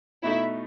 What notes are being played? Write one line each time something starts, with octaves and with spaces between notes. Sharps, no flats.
B2 A3 D#4 E4 E5